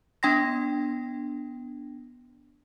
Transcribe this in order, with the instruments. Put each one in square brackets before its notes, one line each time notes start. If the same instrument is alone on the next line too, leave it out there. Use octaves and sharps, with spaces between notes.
[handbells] B3 D4 G5 C6 A#6